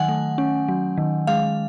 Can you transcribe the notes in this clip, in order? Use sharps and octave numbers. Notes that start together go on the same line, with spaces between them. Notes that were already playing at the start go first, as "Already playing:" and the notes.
Already playing: D#3 F#3 F#5 G#5
A3
C#4
F#3
D#3
G#3 F5